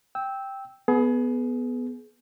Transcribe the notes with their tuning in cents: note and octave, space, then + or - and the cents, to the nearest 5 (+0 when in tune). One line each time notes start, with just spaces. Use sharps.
G5 +0 E6 -15
B3 +0 G#4 +30